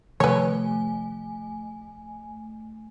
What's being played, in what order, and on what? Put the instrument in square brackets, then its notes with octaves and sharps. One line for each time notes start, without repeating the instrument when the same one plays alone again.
[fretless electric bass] C3 D#3 F3 [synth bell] A3 G#5 [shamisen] B4 C#5